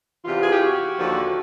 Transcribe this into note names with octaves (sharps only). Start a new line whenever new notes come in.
E2 C3 E3 F4
G#4
G4
F#4
D#2 D3 F3